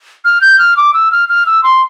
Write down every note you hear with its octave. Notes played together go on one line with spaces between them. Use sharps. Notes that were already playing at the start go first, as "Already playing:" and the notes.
F6
G6
F6
D6
E6
F6
F6
E6
C6